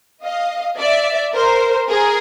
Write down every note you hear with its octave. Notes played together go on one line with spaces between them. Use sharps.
D#5 F5
D5 E5
A#4 C5
G#4 A#4